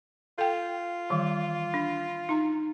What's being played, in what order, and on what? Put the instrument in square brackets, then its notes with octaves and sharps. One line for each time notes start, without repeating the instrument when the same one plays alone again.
[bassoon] F4 [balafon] A4 G5
[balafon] D#3 E3 G3
D4
D#4 A#5